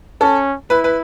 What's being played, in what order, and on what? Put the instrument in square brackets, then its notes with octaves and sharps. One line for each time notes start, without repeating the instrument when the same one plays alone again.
[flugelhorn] C#4 [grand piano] A4
[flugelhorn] E4 [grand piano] B4
[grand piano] B4